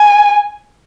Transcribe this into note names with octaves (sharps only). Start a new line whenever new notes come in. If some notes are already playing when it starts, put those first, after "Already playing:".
Already playing: G#5